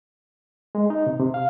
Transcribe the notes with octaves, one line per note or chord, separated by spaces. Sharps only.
G#3
D#4
C3
C3
F5